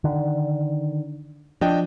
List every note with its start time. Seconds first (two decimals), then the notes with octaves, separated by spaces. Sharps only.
0.04 D3 D#3
1.61 F3 D4 D#5 G5